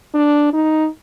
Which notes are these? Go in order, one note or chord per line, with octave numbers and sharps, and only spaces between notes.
D4
D#4